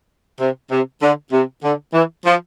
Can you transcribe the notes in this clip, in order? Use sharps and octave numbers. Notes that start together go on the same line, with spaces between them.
C3
C3
D3
C3
D3
E3
F3